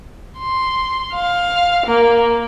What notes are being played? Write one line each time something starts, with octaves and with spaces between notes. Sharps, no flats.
C6
F5
A#3